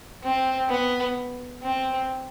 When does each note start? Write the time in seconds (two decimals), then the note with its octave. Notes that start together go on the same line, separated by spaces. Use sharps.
0.23 C4
0.69 B3
1.63 C4